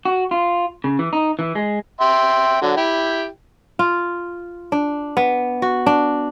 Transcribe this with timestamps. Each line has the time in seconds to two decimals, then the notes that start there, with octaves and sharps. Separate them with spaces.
0.05 F#4
0.31 F4
0.84 C#3
0.99 E3
1.13 D#4
1.39 E3
1.55 G#3
2.01 E5 G5 C6
2.62 D3 F#3
2.77 E4 G4 G5
3.79 F4
4.72 D4
5.17 B3
5.62 F#4
5.86 D4